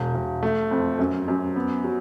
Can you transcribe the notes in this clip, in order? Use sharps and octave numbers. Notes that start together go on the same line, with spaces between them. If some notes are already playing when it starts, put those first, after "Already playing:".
Already playing: E1
E1
A3
F2
F#2
F#2
B3
F#3